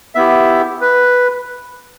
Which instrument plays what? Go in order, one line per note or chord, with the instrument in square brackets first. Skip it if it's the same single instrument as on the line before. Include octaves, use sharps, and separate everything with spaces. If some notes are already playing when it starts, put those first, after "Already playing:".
[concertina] B3 E4 G4 E5
B4